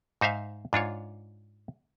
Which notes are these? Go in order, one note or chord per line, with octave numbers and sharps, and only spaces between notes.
G#2 D#4 C5 E5 F5
G#2 D4 F4 C#5